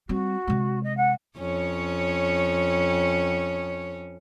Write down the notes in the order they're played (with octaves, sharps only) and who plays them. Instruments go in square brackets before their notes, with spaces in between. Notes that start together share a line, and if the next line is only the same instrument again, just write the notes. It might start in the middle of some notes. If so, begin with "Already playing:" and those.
[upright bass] G3 C4 [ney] F#4
[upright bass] C3 G#3
[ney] D#5
F#5
[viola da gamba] F2 C#4 C#5